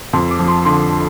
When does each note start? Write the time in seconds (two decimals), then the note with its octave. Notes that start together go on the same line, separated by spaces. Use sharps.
0.13 F2 C6
0.31 D6
0.39 F3
0.48 C6
0.65 D3 C6